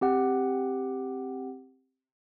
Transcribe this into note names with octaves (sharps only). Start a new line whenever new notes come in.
C4 G4 F#5